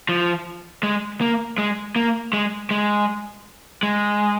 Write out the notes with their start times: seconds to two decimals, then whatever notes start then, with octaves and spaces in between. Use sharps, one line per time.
0.09 F3
0.83 G#3
1.21 A#3
1.58 G#3
1.96 A#3
2.33 G#3
2.71 G#3
3.83 G#3